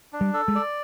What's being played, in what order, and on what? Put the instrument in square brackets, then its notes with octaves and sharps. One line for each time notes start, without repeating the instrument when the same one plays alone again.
[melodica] D4
[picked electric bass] G3
[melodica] A4
[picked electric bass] G#3
[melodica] D5